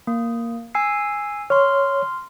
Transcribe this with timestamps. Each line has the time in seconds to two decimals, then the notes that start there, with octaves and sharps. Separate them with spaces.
0.07 A#3
0.75 G#5 E6 C7
1.50 C#5 C6 F6